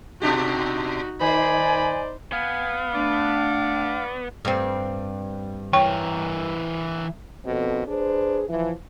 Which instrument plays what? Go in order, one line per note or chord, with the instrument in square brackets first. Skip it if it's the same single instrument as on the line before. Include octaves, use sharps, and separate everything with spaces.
[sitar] B2 D4 G4 [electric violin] D#4 F#4
[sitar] D#3 [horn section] D#4 C5 D5 [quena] G#5 [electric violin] B5
[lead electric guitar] B3 [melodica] F5 [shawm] G#5
[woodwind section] A3 D4 [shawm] D5
[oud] G2 C4
[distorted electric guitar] E3 A#4 [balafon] C#5 G5 C#6
[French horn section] D#2 B2 F3 C4 A4
D4 G#4 B4 C5
E3 F3